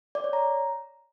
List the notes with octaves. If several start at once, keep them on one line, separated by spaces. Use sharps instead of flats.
D5
C#5
A#5